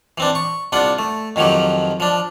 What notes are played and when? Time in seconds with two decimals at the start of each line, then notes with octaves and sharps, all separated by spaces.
0.18 E3 C4 D4
0.35 C#6
0.72 C2 D4 F4 F#5
0.99 A3
1.36 F2 D#3 F3 F#3 G4
2.00 F3 D4